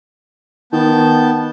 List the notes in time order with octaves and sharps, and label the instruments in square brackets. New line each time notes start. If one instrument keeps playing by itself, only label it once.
[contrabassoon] D#3 [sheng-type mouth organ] B3 A5 G6